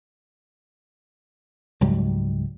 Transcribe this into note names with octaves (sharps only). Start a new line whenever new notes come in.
C#2 G#2 F#3 G3